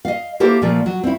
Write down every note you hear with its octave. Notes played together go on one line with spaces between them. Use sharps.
D#5 F5
A#3 E4 G4 A4 C5
A#2 F3 A3
F#3
C4 E4